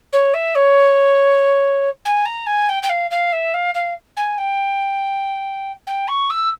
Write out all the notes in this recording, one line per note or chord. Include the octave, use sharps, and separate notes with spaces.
C#5
E5
C#5
G#5
A#5
G#5
G5
G5
F5
F5
E5
F5
F5
G#5
G5
G5
C#6
E6